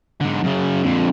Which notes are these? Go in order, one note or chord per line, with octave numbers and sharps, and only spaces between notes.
G#2 D3
F#2 C#3
F2 D3